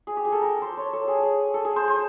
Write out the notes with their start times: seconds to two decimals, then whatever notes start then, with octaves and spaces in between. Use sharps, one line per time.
0.07 G#4
0.17 G4
0.25 G#4
0.32 A4
0.42 A#4
0.47 A4
0.62 C5
0.77 C#5
0.93 A4
1.08 G#4
1.23 G#4
1.54 A4
1.65 G#4
1.76 C5
1.88 C5